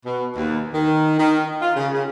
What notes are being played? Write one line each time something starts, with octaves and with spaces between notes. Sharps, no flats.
B2
D#2
D#3
D#3
F4
C#3
C#3